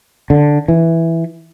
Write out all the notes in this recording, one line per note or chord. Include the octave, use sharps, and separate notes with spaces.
D3
E3